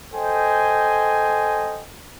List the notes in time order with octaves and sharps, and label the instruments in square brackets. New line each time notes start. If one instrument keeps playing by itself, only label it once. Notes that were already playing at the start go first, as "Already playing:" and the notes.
[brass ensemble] A4 C5 D#5 G5 G#5